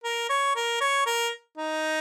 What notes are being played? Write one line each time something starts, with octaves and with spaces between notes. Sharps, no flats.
A#4
C#5
A#4
C#5
A#4
D#4